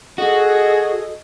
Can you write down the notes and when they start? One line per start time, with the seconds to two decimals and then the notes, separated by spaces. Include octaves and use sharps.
0.18 F#4 G#4 A4 D#5